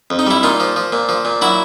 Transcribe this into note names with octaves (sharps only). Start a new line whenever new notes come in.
F2
D#4
G3 E4
A#2 D#4 F4
F3
F3
A#2
F3
A#2
F#3 E4 F#4